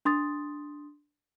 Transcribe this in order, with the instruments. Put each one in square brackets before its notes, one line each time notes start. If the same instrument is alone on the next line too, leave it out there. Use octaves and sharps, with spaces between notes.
[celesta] D4 C6 D#6 A6